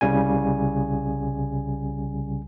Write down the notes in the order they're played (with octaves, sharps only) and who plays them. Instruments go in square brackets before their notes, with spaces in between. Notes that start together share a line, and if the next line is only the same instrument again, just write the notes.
[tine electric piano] C2 C#3 G3 G#5